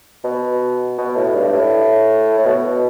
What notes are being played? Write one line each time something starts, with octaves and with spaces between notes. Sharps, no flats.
B2
B2
A2
G2
A2
A2
B2